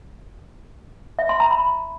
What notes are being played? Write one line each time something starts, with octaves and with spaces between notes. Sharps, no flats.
E5
C6
A#5
B5